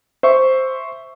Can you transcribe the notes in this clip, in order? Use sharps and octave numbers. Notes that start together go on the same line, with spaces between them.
C5 E5 C#6